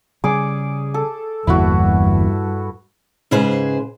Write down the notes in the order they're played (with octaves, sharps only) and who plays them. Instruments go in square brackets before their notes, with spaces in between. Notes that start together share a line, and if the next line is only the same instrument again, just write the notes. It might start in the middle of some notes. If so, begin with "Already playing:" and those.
[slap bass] C#3 G3 [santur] G#4 D6
[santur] A4
[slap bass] G1 E2 A#3 [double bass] G2 [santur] E4 F#4
[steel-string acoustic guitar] G#2 C#3 G#4 B4 C5